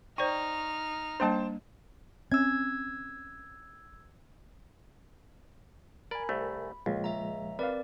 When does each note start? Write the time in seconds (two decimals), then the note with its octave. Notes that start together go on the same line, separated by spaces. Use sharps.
0.18 D#4 C5 D5 G5 C#6 F6
1.20 G3 A#3 D4 C5 G5 A5
2.32 C4 C#4 E6 G#6
6.11 A#4 D5 G#5 B5
6.29 C2 A3
6.86 C#2 A#2 F3 G#3
7.04 E5 A#5
7.59 C4 A#4 B4 D5 F5